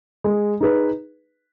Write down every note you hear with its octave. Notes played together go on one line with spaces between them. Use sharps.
G#3
D#4 G#4 B4